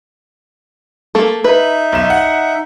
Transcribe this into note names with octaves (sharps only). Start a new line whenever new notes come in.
A3 A#3 A4
D#4 B4 E5
B1 E7
F#5